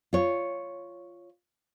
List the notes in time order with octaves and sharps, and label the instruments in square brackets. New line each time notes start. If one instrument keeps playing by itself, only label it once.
[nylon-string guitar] F4 C#5